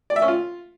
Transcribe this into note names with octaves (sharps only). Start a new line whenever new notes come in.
D5
E5
C#4
F4